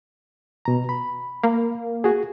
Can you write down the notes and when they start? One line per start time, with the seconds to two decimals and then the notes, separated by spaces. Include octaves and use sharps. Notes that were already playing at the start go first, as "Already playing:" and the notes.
0.65 B2 A#5
0.89 B5
1.43 A#3
2.04 F#4 G#4